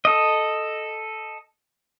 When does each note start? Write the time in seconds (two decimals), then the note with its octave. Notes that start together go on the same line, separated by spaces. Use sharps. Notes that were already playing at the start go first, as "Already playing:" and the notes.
0.05 A4 D#5